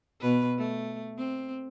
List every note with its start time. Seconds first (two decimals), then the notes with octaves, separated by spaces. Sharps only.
0.21 B2 B4
0.58 A3
1.18 C4